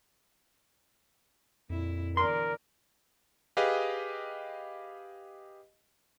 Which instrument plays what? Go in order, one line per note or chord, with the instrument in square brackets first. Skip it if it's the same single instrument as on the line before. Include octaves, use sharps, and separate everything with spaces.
[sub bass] F2 [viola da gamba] A#2 E4
[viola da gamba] E2 D3 D5 [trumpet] A#4 [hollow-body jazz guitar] C6
[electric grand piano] G4 G#4 B4 D#5 F5